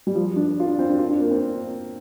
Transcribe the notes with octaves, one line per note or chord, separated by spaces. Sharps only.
G3
F3
D4
F4
D4
C4
D4
F4
D4
A#3
C4